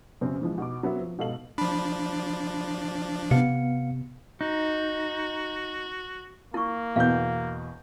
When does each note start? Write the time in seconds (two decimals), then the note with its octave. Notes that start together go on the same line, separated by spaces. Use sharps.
0.21 F#2 C#3 C4
0.42 E3 F3 G#3
0.58 B2 D#4 D6
0.83 F#3 B3 C4 A#4 E5
1.01 F3
1.18 G#2 B2 D#4 A4 F5 F#7
1.58 F3 D4 B5
3.31 C3 B3 F5 C#7
4.41 D#4 F#4
6.54 A#3 E4 C#6
6.96 E2 B2 F5 G6